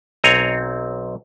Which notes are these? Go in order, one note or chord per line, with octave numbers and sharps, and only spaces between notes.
B1 C4 C#5 G#5 A#5